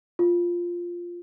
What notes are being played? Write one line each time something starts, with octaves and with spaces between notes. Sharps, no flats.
F4